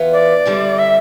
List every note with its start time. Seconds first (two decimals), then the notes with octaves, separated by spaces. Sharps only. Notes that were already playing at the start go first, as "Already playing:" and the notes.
Already playing: E3 B3 F4
0.12 D5
0.46 D3 G3 C4 E4
0.79 E5